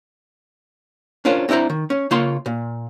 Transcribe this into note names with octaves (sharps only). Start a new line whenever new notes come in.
C#4 D4 F4 A#4 C5 C#5
C4 D4 E4 C5 A#5
D#3
C#4
C#3 A#3 F4 C#5 C6
A#2